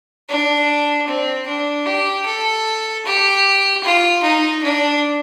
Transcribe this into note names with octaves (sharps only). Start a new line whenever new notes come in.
D4
C4
D4
G4
A4
G4
F4
D#4
D4